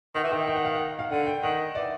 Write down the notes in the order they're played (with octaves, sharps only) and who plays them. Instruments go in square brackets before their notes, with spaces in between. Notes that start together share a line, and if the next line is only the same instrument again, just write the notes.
[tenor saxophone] D#3 [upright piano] F#5
[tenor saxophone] E3
[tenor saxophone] D#3 [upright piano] G5
[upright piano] G5
F#5
F5
F#5
F5
[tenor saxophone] D3 [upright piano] F#5
[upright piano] G5
[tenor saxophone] D#3 [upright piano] F#5
[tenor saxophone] E3 [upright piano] D5